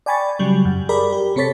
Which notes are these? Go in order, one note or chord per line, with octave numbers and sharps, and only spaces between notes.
D5 G5 G#5 B5 C#6 A6
C#3 F#3 G3
F#2
G4 G#4 A#4 D5 B5
G4
C3 C4 A4 C#5 A6 B6